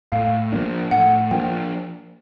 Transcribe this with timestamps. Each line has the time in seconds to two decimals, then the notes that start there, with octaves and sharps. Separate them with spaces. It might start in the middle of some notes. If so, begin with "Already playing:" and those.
0.12 A2 F5
0.52 F3 A#3 D4
0.91 A2 F#5
1.31 F3 A#3 D4 G5